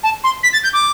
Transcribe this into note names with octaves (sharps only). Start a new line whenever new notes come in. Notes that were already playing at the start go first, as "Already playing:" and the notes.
A5
C6
B6
A6
G6
D6